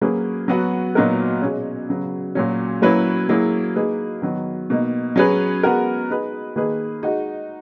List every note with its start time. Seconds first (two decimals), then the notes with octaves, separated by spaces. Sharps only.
0.01 F#3 A#3 C#4 G#4 B4
0.48 F#3 B3 F#4
0.95 A#2 F#3 B3 D#4 A#4
1.42 B2 G#3 C#4
1.89 C#3 F#3 B3
2.35 A#2 F#3 C#4
2.82 F#3 A#3 C#4 E4 B4
3.29 F#3 A#3 E4 G#4
3.76 A#3 D#4 G#4 B4
4.22 D#3 F#3 B3
4.70 B2 A#3 D#4
5.16 F#3 C#4 G#4 B4
5.63 G#3 B3 F#4 A#4
6.09 G#3 D#4 G#4 B4
6.56 D#3 A#3 D#4 G#4 B4
7.02 G#3 D#4 F#4